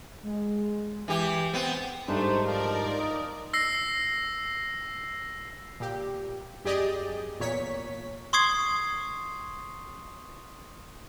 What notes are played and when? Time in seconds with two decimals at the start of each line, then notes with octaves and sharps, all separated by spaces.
0.23 G#3
1.08 E3 G4
1.54 B3 C4 G5
2.08 G#2 G3 A3 D4 D#4 C5
2.46 F3 A#4 D5
2.99 D#5
3.53 E6 A#6 C7
5.80 A#2 G4
6.65 F#2 G4 G#4 D5 D#5
7.40 E2 A#2 C#5 B6
8.33 C6 C#6 D#6 G#6 C7